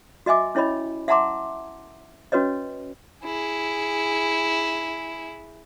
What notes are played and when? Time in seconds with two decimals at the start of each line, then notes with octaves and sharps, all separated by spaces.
0.26 F#4 D#5 E5 G#5 D6
0.55 C#4 E4 C#5 D#5 B5
1.08 E5 F#5 A5 A#5 C6 D6
2.32 C#4 F#4 B4 C#5 D#5
3.24 E4 G#4